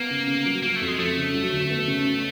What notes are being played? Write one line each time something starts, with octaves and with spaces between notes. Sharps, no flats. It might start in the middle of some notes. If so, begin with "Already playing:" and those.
Already playing: A#3 B3
C#3
C#3
F#3
F#3 A#3
A3
F2
G#3
F2 A3
C#3
F#3
D2
B3
C#3
C#4